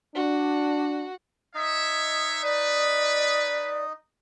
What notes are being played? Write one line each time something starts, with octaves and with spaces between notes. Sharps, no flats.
D4 F#4
D#4 C#5 D#5 E5
B4 D5